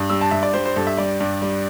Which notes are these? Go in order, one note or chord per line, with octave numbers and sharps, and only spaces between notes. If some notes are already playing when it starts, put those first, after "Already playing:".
Already playing: G2
G3 E6
A5
G2 E5
D5
G3 C5
C5
G2 A4
E5
G3 D5
G2
G3